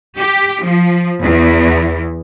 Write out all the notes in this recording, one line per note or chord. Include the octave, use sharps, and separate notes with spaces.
G4
F3
E2